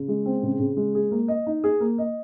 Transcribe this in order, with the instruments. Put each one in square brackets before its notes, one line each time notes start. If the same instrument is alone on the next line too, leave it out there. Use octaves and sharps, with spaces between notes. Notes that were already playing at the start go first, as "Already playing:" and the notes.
Already playing: [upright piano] C#3
G#3
C4
C#3
C#3
G#3
G#4
A#3
D#5
D#4
G#4
A#3
D#5